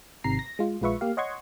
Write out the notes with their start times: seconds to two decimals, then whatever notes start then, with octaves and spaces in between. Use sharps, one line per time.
0.24 G#1 C3 D#3 A#5 C7
0.39 A#6
0.59 G#3 F4
0.81 A#1 G#3 F4 B4 E5 C#6
1.01 A#3 G4 F5
1.17 C#5 D#5 F#5 C6 C#6 G#6